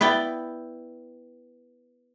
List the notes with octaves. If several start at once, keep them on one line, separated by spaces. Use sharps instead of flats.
B3 E4 D5 G5